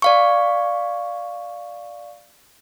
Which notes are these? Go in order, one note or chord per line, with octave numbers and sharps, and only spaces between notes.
D5 F5 C#6